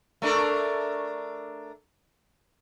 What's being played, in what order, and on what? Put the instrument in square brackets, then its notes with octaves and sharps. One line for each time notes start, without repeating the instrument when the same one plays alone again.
[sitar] A3 D4 A#4